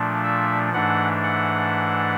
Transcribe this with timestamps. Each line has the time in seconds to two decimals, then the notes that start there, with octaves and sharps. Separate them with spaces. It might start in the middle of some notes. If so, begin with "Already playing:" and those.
Already playing: A#2 F3 A3 D4
0.23 E5
0.73 G#2 E3 A3 D4 F#5
1.23 F#5